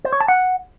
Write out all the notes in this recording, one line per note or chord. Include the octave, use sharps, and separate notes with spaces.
C5
C#5
A5
F#5